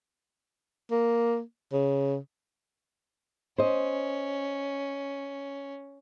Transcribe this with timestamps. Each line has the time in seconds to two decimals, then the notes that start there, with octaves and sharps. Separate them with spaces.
0.91 A#3
1.73 C#3
3.58 C#4 C5 D#5